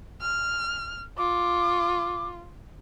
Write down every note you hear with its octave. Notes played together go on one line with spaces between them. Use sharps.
F6
F4 D6